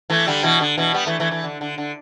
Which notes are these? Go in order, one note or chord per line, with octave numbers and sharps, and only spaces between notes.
E3 A3
D3 G3
B2 E3
D3
B2 E3
G3 B3
E3 A3
E3 A3
E3 A3
D3
D3
D3